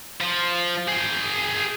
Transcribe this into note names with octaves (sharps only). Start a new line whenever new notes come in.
F3
G#4 G5